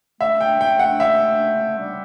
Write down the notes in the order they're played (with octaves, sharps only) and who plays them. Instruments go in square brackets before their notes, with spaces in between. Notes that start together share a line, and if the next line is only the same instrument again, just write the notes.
[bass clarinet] A3 [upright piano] E5
[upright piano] G5
[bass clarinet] A3 [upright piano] G5
[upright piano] F#5
E5
[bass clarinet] G3